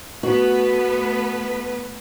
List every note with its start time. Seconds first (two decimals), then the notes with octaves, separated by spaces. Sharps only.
0.23 A3 B3 F#4 B4